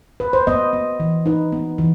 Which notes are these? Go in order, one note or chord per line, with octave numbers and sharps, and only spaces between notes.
B4
C5
B3 D#5
B3
E3
D#4 B4
B3
E3